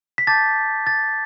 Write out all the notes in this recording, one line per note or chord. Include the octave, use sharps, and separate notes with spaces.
B6
A5 D6 G6 A6
A6